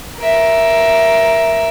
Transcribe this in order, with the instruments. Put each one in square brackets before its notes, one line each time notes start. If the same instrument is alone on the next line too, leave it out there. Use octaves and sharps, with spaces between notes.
[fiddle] A#4 E5